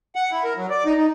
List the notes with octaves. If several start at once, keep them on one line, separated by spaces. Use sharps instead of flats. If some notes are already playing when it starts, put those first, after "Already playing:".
F#5
E4
A#4
F#3
D5
D#4
D#4